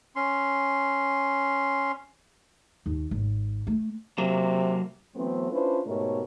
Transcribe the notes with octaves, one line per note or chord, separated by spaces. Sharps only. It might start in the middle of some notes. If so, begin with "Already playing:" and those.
C#4 C6
D#2
G#1
A3
C3 F#3 A#3
E3 F#3 A3 B3 C4
C#4 D4 E4 F4 B4 C5
G#2 B2 A3 G4 A#4 C#5